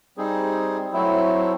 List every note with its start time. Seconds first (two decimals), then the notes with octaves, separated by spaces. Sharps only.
0.17 G3 C4 D#4 G#4
0.93 F#3 A3 C4 E4